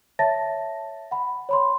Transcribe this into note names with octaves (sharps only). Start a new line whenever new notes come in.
C#5 E5 A5 A6 A#6
F#5 B5
C#5 B5 C6